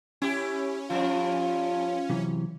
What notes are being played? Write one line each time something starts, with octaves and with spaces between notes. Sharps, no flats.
C#4 E4 G4
G2 F3 F4
C3 E3 F#3